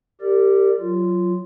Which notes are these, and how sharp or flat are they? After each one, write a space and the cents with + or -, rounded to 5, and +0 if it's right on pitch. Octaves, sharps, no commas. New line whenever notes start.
G4 +0 A#4 -35 D5 +0
F#3 +0 F4 -10